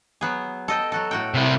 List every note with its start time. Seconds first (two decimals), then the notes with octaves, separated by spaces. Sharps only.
0.21 F#3 B3 G#4
0.68 A4 D#5 G5
0.92 F#3 F#4 A4
1.11 A2 F#4 G5
1.34 C3 E4